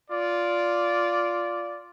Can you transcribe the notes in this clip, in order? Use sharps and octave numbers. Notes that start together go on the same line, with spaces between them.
F4 D5